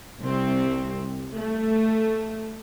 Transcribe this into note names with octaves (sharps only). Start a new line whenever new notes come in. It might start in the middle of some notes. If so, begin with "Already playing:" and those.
C2 C4
A3